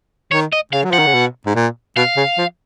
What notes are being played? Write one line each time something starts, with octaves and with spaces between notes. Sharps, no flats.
D#3 C#5
D#5
C#3 F5
F#3
F3
F#5
D#3
C#3
B2
G#2
A#2
B2 F5
C#3
F3